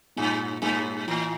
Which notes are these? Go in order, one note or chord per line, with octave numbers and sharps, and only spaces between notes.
G2 A#2
G2 A#3
A2 E3